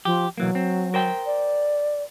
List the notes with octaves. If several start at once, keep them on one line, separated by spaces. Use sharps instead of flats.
F3 G4
B1 E3 F#3 A#3
C4
A#4 C5 G5
D5